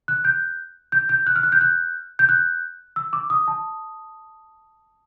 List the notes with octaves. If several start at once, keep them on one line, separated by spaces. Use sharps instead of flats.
F#6
G6
G6
G6
F#6
F6
F#6
G6
F#6
G6
F#6
E6
D6
D#6
A5